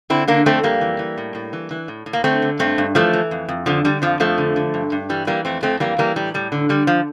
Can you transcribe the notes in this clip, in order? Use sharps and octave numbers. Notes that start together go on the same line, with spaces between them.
D3 C4 E4
D3 A#3 D4
F2 A3 C4
F2 G3 A#3
E3
E3
A2
A2
E3
E3
A2
A2
A#3
D3 A3 C4
D3
G2 A3 C4
G2
E3 F3 A3
E3
F2
F2
D3 F3
D3 G3
F2 F3
F2 F3 A3
D3
D3
G2
G2
E3 G3
E3 G3 A#3
F2 A3 C4
F2 A3 C4
E3 G3 A#3
E3 G3 A#3
A2 G3
A2 G3
D3
D3 G3
F3